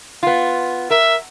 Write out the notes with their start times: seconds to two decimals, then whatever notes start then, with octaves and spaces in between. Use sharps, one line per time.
0.23 B3 F4
0.90 A#4 E5